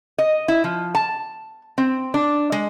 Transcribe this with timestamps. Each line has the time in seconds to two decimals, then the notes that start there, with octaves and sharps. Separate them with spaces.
0.18 D#5
0.48 E4
0.64 F3
0.95 A5
1.78 C4
2.14 D4
2.52 G#3